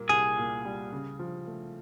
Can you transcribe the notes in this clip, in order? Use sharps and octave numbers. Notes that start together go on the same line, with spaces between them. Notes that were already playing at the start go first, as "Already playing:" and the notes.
Already playing: A#2 G3 A#3
C2 G#4
A#2
G3
C#3
F3
A3